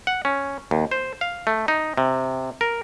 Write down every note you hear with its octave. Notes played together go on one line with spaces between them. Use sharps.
F#5
C#4
D#2
C5
F5
A3
D#4
C3
A#4